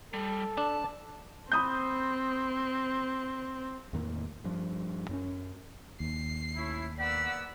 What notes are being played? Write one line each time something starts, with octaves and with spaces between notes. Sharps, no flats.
G3 A4
D4 A5
C4 B5 D#6 G6
E2 A2 D#3 A#3
G2 F3
F#2 C4 C#4
D#2 C7
A3 C#4 E4
A#3 B3 D5 F#5 E6 B6